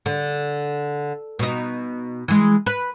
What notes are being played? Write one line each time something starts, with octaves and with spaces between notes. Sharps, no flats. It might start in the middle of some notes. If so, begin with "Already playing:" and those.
D3
B2 D#4
E3 G#3
B4